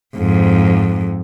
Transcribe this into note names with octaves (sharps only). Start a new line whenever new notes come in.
F2 G#2